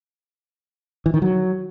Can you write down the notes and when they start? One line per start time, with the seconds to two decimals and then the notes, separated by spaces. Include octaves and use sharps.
1.06 E3
1.14 D#3
1.22 F#3